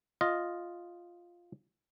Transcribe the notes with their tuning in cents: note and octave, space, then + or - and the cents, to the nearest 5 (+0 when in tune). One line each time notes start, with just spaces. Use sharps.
F4 +0 D#5 +0